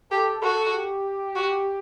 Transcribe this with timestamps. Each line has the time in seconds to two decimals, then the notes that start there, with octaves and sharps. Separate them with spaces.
0.11 G4 A4
0.42 F#4 A4
0.73 G4
1.35 F#4